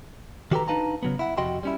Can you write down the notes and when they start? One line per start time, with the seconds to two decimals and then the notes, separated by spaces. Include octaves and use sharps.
0.51 D#3 F#4 G4 A4 B4 A#5
0.68 D4 D#4 B4 F5 A5 A#5
1.03 C#3 F#3 B3
1.19 E4 F#5
1.38 F2 C3 F#4 D#5 G5 C6
1.63 G3 C#4 E4